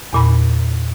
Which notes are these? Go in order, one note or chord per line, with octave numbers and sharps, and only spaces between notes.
E2 A#2 B5